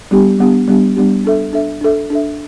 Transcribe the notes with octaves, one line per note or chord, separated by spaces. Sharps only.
G3 B3 D4 G4
G3 B3 D4 G4
G3 B3 D4 G4
G3 B3 D4 G4
D4 A4 E5
D4 A4 E5
D4 A4 E5
D4 A4 E5